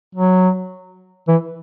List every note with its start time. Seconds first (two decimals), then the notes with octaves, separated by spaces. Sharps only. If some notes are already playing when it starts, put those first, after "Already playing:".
0.15 F#3
1.28 E3